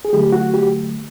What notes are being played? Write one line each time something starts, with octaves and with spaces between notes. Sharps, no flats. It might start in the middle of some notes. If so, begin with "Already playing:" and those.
G#4
D3 F#3 A3 G4
F#4
G4